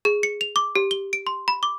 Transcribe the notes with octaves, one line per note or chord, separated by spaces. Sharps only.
G#4
C#7
F7
D6
G4
G7
D7
C6
B5
D6